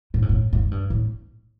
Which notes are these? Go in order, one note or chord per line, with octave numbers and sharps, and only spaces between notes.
A2
G#2
A2
A2
G#2
G2
A2